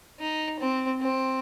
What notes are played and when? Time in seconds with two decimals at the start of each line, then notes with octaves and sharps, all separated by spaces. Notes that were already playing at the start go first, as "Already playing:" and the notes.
0.20 D#4
0.60 C4
1.01 C4